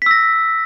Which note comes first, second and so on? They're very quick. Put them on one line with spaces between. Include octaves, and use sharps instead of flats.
B6 E6 A#6